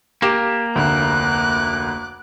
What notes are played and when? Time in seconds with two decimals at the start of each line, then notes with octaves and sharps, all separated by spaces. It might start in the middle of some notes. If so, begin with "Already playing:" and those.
0.22 A#3 G4 D6 E7
0.76 F1 D2 D6 F#6